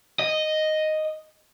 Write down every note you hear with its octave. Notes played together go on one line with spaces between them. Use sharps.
D#5